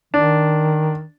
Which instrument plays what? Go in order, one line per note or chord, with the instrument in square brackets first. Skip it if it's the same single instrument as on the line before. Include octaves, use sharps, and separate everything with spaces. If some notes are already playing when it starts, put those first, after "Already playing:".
[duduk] D#3 [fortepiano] D4